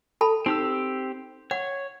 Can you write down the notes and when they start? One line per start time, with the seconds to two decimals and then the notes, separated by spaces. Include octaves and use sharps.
0.21 A4 A5 B5
0.46 C4 D#4 G4 E6
1.51 C#5 F#5